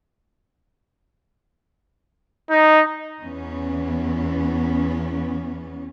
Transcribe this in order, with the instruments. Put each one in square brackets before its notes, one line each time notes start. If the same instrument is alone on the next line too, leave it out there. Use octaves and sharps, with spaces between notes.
[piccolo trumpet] D#4
[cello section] E2 E3 B3 C#4